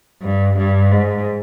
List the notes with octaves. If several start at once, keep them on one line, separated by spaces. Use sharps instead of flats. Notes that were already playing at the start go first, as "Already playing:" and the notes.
G2
G2
G#2